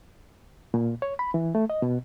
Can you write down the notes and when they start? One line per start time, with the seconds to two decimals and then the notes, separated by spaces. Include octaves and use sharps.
0.74 A#2
1.02 C#5
1.19 B5
1.34 E3
1.55 A3
1.70 D#5
1.82 B2